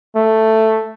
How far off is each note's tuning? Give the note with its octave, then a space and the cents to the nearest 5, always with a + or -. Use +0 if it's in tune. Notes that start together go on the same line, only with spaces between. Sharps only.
A3 +5